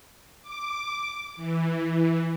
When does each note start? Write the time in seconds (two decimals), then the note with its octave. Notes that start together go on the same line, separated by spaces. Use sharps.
0.42 D6
1.36 E3